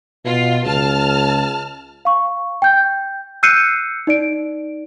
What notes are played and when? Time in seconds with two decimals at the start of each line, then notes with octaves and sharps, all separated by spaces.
0.25 B2 F4
0.66 C#2 A5 F6
2.05 F5 C#6
2.62 G5 G6
3.43 E6 F#6 G6 C7 C#7 D#7
4.07 D#4 D5 D7